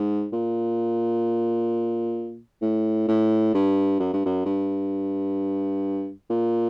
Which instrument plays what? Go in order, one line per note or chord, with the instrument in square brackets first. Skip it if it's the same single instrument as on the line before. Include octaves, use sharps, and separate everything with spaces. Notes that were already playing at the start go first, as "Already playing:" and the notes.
Already playing: [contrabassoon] G#2
A#2
A2
A2
G2
F#2
G2
F#2
G2
A#2